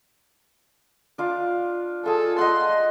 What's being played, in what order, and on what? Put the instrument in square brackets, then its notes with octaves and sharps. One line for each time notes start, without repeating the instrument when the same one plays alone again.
[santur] D4 F4 F5
[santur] F4 G#4 [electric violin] A4
[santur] D#5 F#5 [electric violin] C6